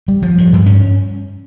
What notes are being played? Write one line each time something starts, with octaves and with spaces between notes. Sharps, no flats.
G3
F3
G2
G2
C#4